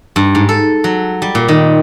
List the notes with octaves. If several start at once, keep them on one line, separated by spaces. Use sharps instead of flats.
G2
G#2
A4
F#3
G3
A#2
D#3